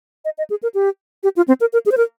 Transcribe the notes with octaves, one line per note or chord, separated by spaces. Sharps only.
D#5
D#5
G#4
A#4
G4
G4
F4
C4
A#4
A#4
G#4
C5
A#4